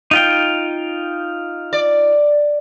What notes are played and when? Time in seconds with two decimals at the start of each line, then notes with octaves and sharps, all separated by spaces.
0.11 D#4 F4 G5
1.73 D5